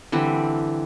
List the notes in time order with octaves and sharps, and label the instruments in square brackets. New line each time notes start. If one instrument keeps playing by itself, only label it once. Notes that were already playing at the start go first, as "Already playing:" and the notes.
[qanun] D3 E3 G3 C4